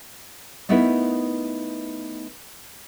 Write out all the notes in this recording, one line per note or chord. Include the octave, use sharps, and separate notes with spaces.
A3 B3 D#4 E4 A#4 B4